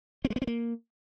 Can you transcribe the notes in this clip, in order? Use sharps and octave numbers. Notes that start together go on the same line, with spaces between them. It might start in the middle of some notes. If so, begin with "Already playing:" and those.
C4
G#3
B3
C4
A#3